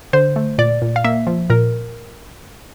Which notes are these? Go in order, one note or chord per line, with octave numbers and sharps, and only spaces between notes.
D3 C5
A3
A#2 D5
A#2
F5
A#3 E5
F3
A#2 A#4